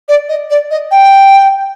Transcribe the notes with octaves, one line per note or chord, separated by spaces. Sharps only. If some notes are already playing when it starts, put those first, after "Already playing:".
D5
D#5
D5
D#5
G5